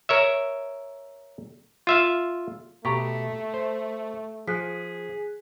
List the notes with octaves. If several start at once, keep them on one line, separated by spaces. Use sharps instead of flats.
A#4 C#5 E5
F4 E5 F5
B2 A3 G4 A#5 C#6 B6
C5
F3 G#4 F#6 B6